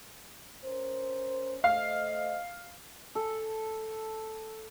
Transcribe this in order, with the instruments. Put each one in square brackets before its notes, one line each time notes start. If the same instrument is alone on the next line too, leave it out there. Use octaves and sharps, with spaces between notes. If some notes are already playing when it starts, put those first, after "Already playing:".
[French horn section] C#4 A#4 C5
[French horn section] A3 C5 D#5 [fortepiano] F5
[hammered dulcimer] A4